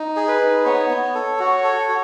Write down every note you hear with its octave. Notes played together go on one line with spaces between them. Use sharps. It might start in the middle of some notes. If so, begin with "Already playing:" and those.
Already playing: D#4
G#4
B4
D#4
B3 C#5
B3
A4
F#4
A4
F#4